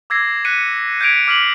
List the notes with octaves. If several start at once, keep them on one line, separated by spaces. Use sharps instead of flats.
D6 E6 G#6 A#6 C7
F#6 B6 C#7 D#7
G6 G#6 B6 D7 F7
D6 F6 B6 C7 F#7